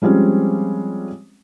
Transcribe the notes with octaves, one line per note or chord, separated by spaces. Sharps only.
F3 G3 G#3 C4 C#4